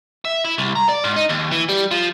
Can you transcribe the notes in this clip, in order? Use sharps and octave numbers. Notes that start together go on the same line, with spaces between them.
E5
E4
C2
A#5
D5
G#2
D#4
D#2
E3
G3
F3